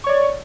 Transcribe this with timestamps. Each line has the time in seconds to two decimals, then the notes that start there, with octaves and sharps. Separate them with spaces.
0.04 C#6
0.07 C#5
0.09 D5